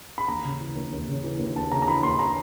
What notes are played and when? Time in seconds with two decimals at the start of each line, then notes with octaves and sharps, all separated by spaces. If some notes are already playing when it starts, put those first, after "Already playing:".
0.18 B5
0.28 D#2 A#5
0.44 C#3
0.61 E3
0.76 D#2
0.92 D#2
1.08 C#3
1.24 E3
1.39 D#2
1.56 D#2 A5
1.72 C#3 A#5
1.82 A#5
1.87 E3 B5
2.03 D#2 C6
2.19 A#5